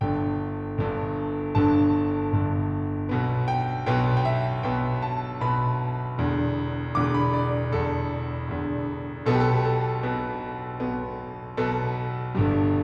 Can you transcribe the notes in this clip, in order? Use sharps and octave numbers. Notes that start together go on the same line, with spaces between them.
G1 G2 D3 G5
G1 G2 D3
G1 G2 D3 A5
G1 G2 D3
B1 B2 B3
G5
B1 B2 B3 G5
G5
E5
B1 B2 B3 G5
A5
B1 B2 B3 B5
E1 E2 D3
E1 E2 D3 D6
B5
D5
E1 E2 D3 A4
E1 E2 D3
B1 B2 B3 A4
G4
A4
A4
B1 B2 B3
B1 B2 B3
B1 B2 B3 A4
G1 G2 G3